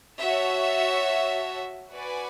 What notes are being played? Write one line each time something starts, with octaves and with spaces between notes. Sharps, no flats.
F#4 C#5 E5 A5
F#4 B4 D5 G#5